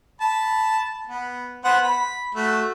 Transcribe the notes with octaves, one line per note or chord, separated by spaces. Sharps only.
A5 B5
B3
B3 C5 F#5
B5
A3 F#4